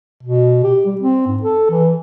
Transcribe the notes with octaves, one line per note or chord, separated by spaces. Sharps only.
B2
G4
G3
C4
G#2
A4
E3